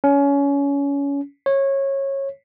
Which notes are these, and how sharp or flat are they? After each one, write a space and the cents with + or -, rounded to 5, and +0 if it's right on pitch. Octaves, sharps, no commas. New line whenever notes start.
C#4 +25
C#5 -20